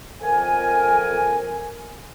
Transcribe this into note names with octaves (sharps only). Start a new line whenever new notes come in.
F2 A#4 G#5